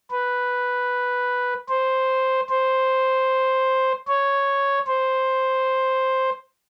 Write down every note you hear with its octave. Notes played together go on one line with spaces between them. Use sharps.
B4
C5
C5
C#5
C5